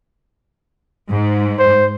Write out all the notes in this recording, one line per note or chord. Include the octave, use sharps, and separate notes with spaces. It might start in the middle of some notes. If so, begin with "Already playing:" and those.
G#2
C5